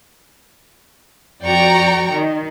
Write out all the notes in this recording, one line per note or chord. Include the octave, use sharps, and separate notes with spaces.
F2 F#4 D5 G5 A#5 C#6
D#3